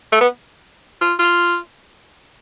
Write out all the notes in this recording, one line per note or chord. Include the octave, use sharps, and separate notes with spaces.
A3
B3
F4
F4